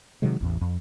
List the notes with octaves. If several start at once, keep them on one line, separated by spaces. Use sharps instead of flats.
C3 D#3 F#3 G#3
A1 E2
F2